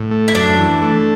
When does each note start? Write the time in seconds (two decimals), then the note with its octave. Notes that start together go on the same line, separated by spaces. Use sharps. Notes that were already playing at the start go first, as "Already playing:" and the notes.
Already playing: A2
0.11 A3
0.28 E4
0.34 F#2 D4
0.59 E3
0.82 A3